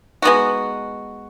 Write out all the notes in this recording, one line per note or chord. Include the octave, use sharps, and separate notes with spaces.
G#3 B3 D#4 F#4